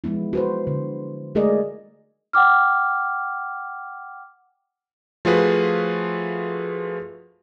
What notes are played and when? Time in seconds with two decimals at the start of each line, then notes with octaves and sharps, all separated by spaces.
0.04 F3 G#3 B3 E4
0.33 F#4 B4 C5
0.67 D3
1.35 G#3 A3 G#4 A#4 D5 D#5
2.33 F#5 G5 D6 F6
5.25 F3 A3 F4 F#4 G#4 B4